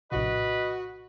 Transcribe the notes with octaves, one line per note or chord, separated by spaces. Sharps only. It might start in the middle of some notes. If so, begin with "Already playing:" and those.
A#1 A2 C3 F#4 B4 D#5